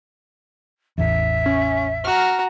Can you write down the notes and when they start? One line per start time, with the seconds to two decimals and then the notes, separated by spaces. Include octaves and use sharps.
0.98 A1 E2 E5
1.46 C#4
2.05 F#4 A#5 F6